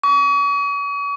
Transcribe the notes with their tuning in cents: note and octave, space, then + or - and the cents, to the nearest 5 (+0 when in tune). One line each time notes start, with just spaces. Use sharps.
C#6 +45